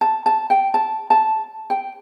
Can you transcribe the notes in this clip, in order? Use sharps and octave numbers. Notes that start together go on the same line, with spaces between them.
A5
A5
G5
A5
A5
G5